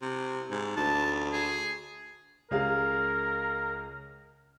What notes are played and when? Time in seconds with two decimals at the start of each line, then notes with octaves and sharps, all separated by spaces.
0.02 C3
0.50 G#2
0.77 D2 A5
1.33 G#4
2.51 C#2 G#4 A#4 F5